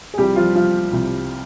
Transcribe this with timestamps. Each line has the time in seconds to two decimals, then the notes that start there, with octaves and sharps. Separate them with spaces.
0.14 G#4
0.18 C2 C3 F3 G3 G4
0.36 F3 F4
0.55 F3 F4
0.92 C2 C3 F3